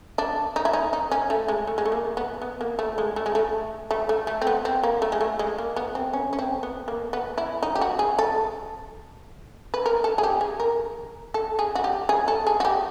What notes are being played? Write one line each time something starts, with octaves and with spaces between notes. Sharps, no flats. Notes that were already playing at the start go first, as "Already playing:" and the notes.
D4
D#4
E4
D#4
D#4
C#4
A3
G#3
A3
G#3
A3
A#3
B3
B3
A#3
A3
G#3
A3
G#3
A3
A3
A3
A3
C4
B3
C4
A#3
A3
G#3
A3
G#3
A#3
B3
C4
C#4
C#4
C4
B3
A#3
B3
E4
D#4
G4
F#4
G#4
A4
B4
A#4
A4
G#4
G4
G#4
A#4
A4
G#4
F#4
G4
G#4
A4
G#4
F#4
G4